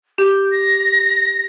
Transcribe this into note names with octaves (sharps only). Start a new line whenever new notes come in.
G4 G6
A#6